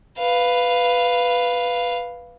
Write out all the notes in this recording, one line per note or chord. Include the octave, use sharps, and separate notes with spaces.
B4 F5